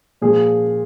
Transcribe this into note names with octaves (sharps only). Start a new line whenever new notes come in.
A#2 F3 G#4